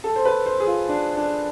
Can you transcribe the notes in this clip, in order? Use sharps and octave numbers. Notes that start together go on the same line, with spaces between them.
A4
C5
B4
C5
G#4
F4
D4
D4